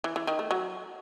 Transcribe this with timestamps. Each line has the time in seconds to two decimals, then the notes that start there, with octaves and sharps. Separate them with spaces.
0.04 E3
0.16 E3
0.27 D#3
0.39 A3
0.51 F#3